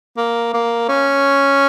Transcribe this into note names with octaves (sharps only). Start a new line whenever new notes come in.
A#3
A#3
C#4